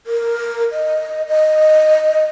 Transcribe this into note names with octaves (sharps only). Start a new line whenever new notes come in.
A#4
D#5
D#5